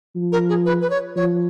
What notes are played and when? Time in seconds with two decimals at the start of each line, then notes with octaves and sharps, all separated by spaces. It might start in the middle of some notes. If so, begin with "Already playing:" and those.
0.15 F3
0.32 A#4
0.49 G#4
0.66 B4
0.82 B4
0.90 C#5
1.16 F3 C#5